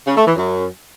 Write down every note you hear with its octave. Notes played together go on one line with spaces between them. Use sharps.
C#3
A3
E3
F#2